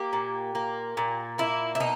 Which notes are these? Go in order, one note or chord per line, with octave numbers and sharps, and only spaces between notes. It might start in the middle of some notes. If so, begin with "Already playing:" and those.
Already playing: A#3 G4
A#2
A#3
A#2
A#3 E4
E4
B2 D#4